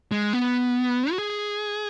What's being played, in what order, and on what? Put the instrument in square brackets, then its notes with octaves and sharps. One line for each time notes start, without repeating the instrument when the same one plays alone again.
[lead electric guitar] G#3
B3
F#4
G#4